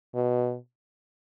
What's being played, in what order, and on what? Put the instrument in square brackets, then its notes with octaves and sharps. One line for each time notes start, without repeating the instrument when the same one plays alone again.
[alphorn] B2